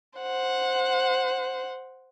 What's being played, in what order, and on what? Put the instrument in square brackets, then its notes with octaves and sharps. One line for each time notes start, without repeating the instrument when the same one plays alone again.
[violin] C5 F#5